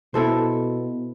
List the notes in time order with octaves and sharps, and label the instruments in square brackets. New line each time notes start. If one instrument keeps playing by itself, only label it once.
[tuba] B2 [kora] E4 A4 C5